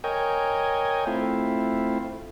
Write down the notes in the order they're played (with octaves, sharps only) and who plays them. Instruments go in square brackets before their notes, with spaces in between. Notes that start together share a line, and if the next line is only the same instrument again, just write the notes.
[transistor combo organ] A#4 C#5 D#5 G5 G#5
A3 C4 E4 F4